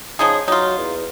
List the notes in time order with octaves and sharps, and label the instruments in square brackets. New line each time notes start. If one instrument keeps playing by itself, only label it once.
[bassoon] C#3 [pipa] F3 D#4 G#4
[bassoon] F#3 [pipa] D#4 F4
[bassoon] E2